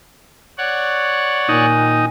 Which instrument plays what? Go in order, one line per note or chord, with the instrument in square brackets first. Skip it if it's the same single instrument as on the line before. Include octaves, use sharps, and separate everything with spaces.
[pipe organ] C#5 D5 F#5
[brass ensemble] A#2 D#3 G#5 [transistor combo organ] D#4